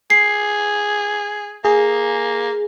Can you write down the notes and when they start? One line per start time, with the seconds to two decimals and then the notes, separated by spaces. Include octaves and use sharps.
0.10 G#4 C7
1.65 A#3 G#4